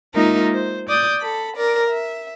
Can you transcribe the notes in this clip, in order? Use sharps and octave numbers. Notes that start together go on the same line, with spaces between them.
G#3 A#3 D#4 F4 A#4 E5
C5
D5 D6 D#6 G6
A4 B5
A#4 D5
E5